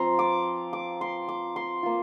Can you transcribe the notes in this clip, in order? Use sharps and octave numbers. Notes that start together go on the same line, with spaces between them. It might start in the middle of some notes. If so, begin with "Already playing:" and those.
Already playing: F3 C4 F4 A#5 C6
D6
D6
C6
D6
C6
A#3 F4